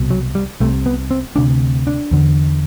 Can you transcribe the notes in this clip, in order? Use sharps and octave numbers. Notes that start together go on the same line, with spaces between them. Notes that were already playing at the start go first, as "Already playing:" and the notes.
Already playing: C2 B2
F#3
G3
C2 C3 A3
B3
C4
D2 C3 D4
D4
E2 D3